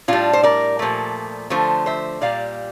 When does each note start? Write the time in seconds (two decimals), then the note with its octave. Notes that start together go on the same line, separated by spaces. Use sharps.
0.08 A2 G3 D4 F4
0.33 C5
0.43 A#4 D5
0.79 A#2 F3 A3
1.50 D3 F3 A3 A4 C5
1.86 C5 E5
2.21 A#2 G3 D5 F5